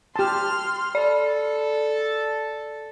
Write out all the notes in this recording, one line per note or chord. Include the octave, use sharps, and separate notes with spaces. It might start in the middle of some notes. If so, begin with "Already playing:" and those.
G4 A5 C6 F6
A4 D5